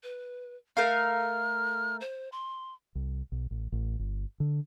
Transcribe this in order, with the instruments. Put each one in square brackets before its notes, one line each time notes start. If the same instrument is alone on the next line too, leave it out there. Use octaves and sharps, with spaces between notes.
[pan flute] B4
[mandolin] A3 A#4 F5 [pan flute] F6
[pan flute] C5
C6
[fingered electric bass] C2
B1
A1
A1
G1
D3